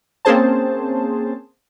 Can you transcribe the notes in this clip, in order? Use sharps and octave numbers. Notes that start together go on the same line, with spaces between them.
A#3 C4 C#4 G#4 C5 A5